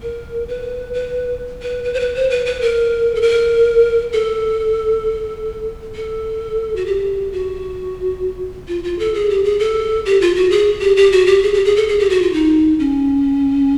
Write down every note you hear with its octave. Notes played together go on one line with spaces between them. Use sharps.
A#4
B4
B4
B4
B4
C5
B4
C5
B4
B4
A#4
A4
A#4
A4
A4
F#4
G4
F#4
F4
F4
A4
G#4
G4
G#4
A4
G4
F4
F#4
G#4
G4
G4
F#4
G4
G#4
G4
G#4
A4
G#4
G4
F#4
F4
D#4
C#4